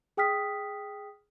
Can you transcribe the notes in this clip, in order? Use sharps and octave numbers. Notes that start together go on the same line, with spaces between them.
G#4 G5 D#6 F6 B6